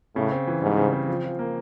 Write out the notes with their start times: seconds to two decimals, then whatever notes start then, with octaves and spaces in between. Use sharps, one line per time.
0.16 A2 C#3
0.32 C4
0.47 E3
0.62 G#2 G3
0.77 C#3
0.92 C4
1.08 F3
1.24 F3
1.39 A#3